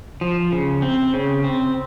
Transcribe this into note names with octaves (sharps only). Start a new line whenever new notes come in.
F3
C#3
C4
C#3
C4